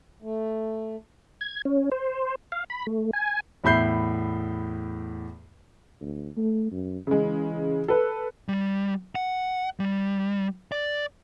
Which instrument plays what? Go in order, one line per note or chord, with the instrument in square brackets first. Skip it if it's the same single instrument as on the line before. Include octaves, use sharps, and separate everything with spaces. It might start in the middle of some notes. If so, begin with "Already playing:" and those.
[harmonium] A3
[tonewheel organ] G#6
C#4
C5
F5
B5
A3
G#5
[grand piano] E2 A2 E5 B5 G6 C7
[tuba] D2
A3
F#2
[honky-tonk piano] C#3 G#3 [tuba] E3
[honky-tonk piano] A4 B4
[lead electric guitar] G3
F#5
G3
D5